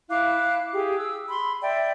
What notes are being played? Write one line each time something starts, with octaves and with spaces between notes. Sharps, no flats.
E4 F5 D6 F#6
G4 G#4
E6
B5 C6
D5 E5 G5